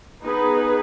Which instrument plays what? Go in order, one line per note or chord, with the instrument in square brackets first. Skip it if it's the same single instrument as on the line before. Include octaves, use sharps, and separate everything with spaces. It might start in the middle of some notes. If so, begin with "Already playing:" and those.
[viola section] B3 D#4 G#4 B4